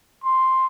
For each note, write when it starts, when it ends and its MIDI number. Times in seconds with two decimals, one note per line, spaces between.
0.24 0.66 84